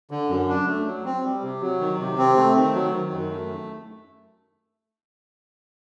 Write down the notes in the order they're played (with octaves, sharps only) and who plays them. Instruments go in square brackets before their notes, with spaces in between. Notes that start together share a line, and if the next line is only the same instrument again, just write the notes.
[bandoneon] D3
F#2
D4
A3
F#3
C4
G3
C3
F#3
D#3
C3
C4
A3
D#3
F#3
D#3
F#2
A3